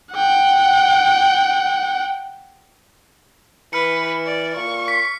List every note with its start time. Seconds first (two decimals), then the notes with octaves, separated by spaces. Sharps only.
0.14 F#5 G5
3.73 E3 B4 F6 C#7
4.26 D5
4.56 A#2 C#6
4.88 B6